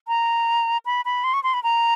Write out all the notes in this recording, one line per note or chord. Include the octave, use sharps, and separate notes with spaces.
A#5
B5
B5
C6
C#6
C6
B5
A#5